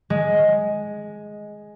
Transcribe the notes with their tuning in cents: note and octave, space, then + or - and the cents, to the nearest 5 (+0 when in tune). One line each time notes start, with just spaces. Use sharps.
G#3 +5